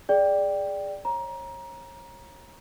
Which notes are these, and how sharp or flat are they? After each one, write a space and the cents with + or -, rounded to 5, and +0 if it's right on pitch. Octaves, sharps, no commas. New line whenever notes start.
G#4 +0 D5 +0 G5 +0
C#5 -35 A#5 +20